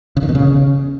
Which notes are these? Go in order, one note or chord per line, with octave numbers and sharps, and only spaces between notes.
C#3
D#3
B2
C#3